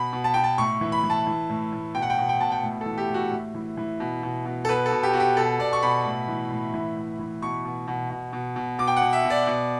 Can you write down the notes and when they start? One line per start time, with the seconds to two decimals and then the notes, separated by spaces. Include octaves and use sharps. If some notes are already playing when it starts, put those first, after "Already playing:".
Already playing: B2 B5
0.13 B2
0.24 A5
0.34 B2 G5
0.44 A5
0.58 A2 C#6
0.81 E3
0.92 B5
1.04 E3
1.10 A5
1.27 E3
1.50 A2
1.72 A2
1.95 B2 G5
2.02 F#5
2.10 G5
2.18 B2
2.29 G5
2.40 B2 A5
2.52 G5
2.63 A2
2.81 A4
2.86 E3
2.98 G4
3.09 A2
3.14 F#4
3.31 A2
3.55 E3
3.77 E3
4.00 B2
4.23 B2
4.46 B2
4.65 A4
4.68 B2 B4
4.86 A4
4.92 B2
5.03 G4
5.13 B2 F#4
5.20 G4
5.37 B2 A4
5.59 B2 D5
5.73 C#6
5.83 B2 B5
6.05 A2
6.28 E3
6.51 A2
6.74 E3
6.96 A2
7.19 E3
7.42 B2 C#6
7.65 B2
7.87 B2
8.10 B2
8.33 B2
8.56 B2
8.79 B2 D6
8.87 G5
8.96 F#5
9.02 B2
9.13 E5
9.25 B2
9.30 D5
9.47 B2